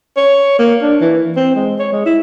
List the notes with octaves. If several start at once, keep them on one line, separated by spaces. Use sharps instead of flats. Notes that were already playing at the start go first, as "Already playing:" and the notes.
C#5
A#3
D4
E3
C4
G#3
C#5
G#3
E4